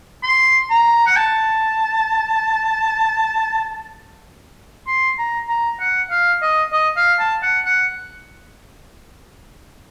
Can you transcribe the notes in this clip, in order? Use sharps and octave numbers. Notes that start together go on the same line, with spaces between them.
C6
A#5
F#5
A5
C6
A#5
A#5
F#5
F5
D#5
D#5
F5
A5
F#5
F#5